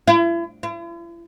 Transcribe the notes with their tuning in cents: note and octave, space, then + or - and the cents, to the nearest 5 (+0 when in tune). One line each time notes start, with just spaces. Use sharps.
E4 +40
E4 +45